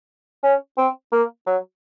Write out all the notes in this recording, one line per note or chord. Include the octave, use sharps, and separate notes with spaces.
C#4
C4
A#3
F#3